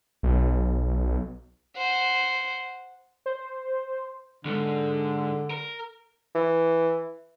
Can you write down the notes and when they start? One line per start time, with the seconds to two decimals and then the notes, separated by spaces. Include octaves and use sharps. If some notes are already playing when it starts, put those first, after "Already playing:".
0.23 B1
1.77 C5 F#5
3.26 C5
4.45 E2 G#2 D3
5.50 A#4
6.35 E3